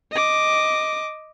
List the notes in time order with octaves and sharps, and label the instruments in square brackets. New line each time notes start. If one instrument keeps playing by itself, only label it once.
[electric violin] D#5 D6